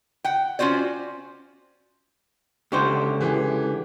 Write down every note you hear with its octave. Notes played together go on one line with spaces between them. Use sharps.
F#5 G5
C#4 F4 F#4 C5 D5
C#2 D3 G4 C5 C#6
E3 G4 G#4